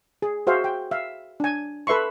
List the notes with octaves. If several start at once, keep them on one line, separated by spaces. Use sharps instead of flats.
G#4
F#4 G#4 C5 E5 F5
G5
E5 F5
D4 G#5
A4 B4 E5 C6 C#6